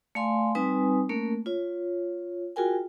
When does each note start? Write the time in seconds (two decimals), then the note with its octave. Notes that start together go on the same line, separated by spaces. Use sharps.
0.15 A3 D5 F5 G#5 C6
0.55 G3 C4 D#4 B4 G#5 D#6
1.09 A3 A#3 C#4 A#4
1.46 F4 C#5
2.56 F4 F#4 G#4 A#4 G5 G#5